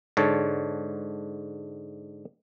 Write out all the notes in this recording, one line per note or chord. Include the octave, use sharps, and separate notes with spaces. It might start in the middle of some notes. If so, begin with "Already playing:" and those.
G#2 D3 C#5 A5